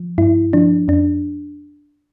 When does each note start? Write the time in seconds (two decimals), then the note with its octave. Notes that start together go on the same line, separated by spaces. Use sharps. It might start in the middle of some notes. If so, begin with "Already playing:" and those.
Already playing: F3
0.18 G2 E4
0.53 F3 D4
0.88 F2 D4